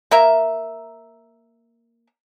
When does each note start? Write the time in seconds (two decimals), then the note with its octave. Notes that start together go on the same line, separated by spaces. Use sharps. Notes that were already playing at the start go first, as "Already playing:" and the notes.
0.11 A#3 A#4 E5